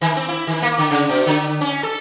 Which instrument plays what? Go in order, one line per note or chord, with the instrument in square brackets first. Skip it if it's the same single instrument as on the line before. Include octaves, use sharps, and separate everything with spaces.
[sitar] D#3
C4
E4
D#3
A#3
D3
C#3
B2
D3
C#4
A4